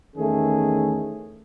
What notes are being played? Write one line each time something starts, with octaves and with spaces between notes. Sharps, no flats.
E2 D#3 A3 C#4 G#4